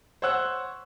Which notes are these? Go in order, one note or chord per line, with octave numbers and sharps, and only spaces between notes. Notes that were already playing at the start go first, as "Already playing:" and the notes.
C5 C#5 F#5 E6 F#6